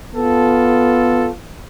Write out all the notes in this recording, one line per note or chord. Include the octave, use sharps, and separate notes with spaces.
B3 F4 A4